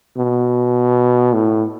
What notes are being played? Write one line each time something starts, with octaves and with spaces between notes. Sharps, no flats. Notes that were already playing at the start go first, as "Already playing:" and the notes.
B2
A2